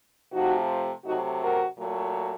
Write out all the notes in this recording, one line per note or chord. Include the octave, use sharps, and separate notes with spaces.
C3 F3 A3 D#4 F#4
C3 F#3 A3 D#4 F#4
F#4 A#4
A#2 F#3 A3